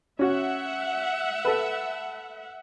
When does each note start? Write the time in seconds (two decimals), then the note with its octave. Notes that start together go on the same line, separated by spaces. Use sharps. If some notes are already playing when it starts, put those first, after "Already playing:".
0.19 C#4 F#4 E5 F#5
1.45 A4 B4